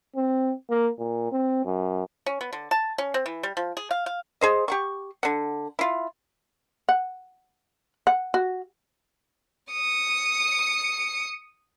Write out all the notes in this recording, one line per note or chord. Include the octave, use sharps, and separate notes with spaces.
C4
A#3
A#2
C4
F#2
C#4
B3
D3
A5
C#4
C4
E3
G3
F3
G#4
F5
F5
G#4 C5 D#5
G4 F#5 C#6
D3 F#5
E4 F4
F#5
F#5
F#4
D#6 C#7